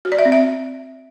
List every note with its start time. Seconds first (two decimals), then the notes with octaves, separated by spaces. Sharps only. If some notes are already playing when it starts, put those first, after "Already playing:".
0.05 F#4
0.12 D5
0.19 E5
0.25 C4
0.32 E5